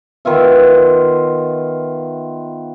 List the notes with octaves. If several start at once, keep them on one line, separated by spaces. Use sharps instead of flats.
D#3 B3 F4 E5